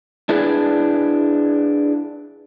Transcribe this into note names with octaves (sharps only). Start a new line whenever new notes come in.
D4 E4 G#4 B4 D5